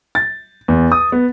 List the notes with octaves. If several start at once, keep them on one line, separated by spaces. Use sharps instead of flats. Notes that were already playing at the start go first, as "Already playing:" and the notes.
A6
E2
D#6
B3